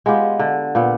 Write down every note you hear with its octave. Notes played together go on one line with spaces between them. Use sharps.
G#3 B3 F4 G4
D3
A#2 B3